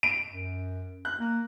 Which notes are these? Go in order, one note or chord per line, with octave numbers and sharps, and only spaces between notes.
D7
F#2
F#6
A#3